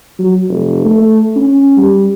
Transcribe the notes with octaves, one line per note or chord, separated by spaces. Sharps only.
F#3
F1
A3
C#4
G3